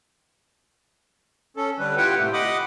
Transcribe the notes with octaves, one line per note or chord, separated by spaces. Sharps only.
C#4 A4
D3 G3 B4
E4 F4 G4 B4 F#5 G5
A2 C3 A3
D#5 F#5 B5 D6 D#6